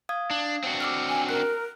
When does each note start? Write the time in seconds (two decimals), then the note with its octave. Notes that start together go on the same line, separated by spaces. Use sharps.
0.09 F5 D#6 G#6
0.30 D4
0.64 C4 D4 F#4
0.80 D6 E6 F6
1.09 G#5
1.29 A#4 F#6